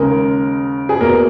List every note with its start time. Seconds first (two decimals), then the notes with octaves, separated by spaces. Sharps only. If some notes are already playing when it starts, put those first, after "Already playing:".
Already playing: D#2 C#3 G#3 A#4
0.89 G#4
1.00 E2 B2 A#3 A#4